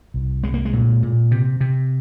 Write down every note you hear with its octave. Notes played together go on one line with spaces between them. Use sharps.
C2
C2 G#3
A#3
G#3
A#2
A#2
C3
C3